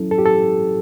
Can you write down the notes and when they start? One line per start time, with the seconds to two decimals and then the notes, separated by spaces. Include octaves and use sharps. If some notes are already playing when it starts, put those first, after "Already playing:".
Already playing: F#3 C#4 E4 A4
0.11 A4
0.18 G4
0.26 A4